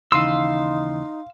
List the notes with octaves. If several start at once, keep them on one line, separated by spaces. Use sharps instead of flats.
D#2 C#3 E3 D#4 F5 C6 E6